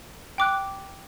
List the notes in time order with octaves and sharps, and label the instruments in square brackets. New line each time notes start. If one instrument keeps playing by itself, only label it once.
[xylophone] G5 D6 F#6